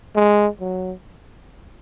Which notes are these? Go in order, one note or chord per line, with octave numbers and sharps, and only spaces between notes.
G#3
F#3